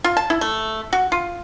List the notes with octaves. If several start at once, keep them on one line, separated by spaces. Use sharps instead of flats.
F4
A5
E4
A3
F#4
F4